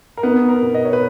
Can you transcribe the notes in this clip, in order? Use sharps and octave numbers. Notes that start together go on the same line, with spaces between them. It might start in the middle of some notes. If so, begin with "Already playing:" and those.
A#4
B3 D#4 B4
A#4
B2
D#5
C#5
B4